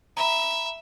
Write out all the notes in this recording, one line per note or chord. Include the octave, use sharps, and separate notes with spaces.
E5 A#5 B5